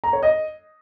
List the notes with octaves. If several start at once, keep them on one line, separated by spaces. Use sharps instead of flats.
A#5
C#5
D#5